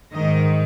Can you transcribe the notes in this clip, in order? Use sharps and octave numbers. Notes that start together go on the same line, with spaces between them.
G#2 D#3 D#5